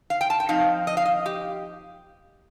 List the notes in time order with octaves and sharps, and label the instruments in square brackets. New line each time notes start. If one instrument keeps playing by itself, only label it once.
[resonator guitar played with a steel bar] F5
G5
A5
G5
F3 C4 D#4 F5
D#5
F5
D#5
G4